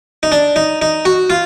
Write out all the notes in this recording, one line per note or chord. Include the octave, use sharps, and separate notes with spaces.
D#4
D4
D#4
D#4
F#4
F4